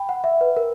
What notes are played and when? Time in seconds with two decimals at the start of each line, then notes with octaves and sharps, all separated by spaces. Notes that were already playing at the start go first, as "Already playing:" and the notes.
Already playing: G5 B5
0.09 F#5
0.24 E5
0.41 B4
0.57 A#4